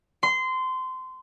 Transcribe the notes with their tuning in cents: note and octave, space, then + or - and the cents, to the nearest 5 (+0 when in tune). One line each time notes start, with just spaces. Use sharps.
C6 -20